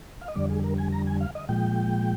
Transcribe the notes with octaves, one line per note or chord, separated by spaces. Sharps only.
F5
D#5
F2 D3 G3 D5
G#4
A#4
G#5
A#5
G#5
F5
D#5
A#2 F3 G#3 G5